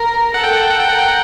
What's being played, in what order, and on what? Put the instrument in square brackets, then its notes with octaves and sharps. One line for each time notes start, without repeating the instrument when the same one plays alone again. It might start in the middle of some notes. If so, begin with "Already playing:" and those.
Already playing: [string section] A#4
[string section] A4 [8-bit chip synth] F#5
[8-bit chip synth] G5
F#5
G5
F#5
G5
[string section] A#4 [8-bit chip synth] F#5
[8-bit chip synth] G5
F#5